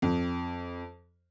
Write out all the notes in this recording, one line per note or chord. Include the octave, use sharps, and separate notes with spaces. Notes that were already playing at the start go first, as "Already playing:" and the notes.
F2